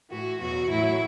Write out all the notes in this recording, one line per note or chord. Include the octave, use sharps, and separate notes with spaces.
A2 E3 F#4
E2 B2 F#3 F#4
A2 F#3 E4